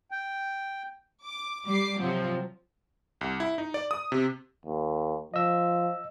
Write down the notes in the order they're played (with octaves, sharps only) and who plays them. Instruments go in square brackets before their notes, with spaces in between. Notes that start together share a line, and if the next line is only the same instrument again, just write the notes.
[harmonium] G5
[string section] D6
G3 D6 C7
C3 F3 F#3 C4
[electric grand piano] C2
E4
D#4
D5
D#6
C3
[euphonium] D#2
[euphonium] F3 [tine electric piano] D#5 E6